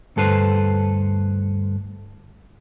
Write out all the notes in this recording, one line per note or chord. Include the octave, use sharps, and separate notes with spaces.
D2 G2 A4 B4 C5